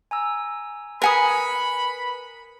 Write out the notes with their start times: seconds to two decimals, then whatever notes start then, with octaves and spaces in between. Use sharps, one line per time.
0.11 G#5 A#5 E6
1.02 A#4 B4 G#5 B5 D#6 C#7